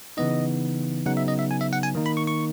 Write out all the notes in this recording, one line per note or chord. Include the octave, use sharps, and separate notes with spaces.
C#3 E3 B3 D#4 D#5
C#3 F#3 B3 D#4 F#5
E5
D#5
E5
G#5
E5
F#5
G#5
D#3 A#3 D#4
B5
C#6
C#6